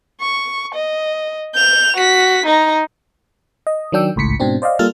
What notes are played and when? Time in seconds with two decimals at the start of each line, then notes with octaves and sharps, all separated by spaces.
0.21 C#6
0.75 D#5
1.55 G6 F7
1.97 F#4 B6
2.46 D#4 A#5
3.67 D#5
3.92 D#3 F#3 D4 G5 E6
4.16 G#1 C#2 A2 B6 C#7
4.40 G#2 B2 C4 D4
4.62 C5 D5 D#5 F5
4.79 G3 A#3 F4 A4 A5 F6